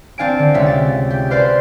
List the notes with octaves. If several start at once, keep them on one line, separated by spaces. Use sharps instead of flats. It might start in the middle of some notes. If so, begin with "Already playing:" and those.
C4 D4 F5 G#5 D7
D3
C#2 C3 E5
A6
G4
B4 C5 D5 F5 C6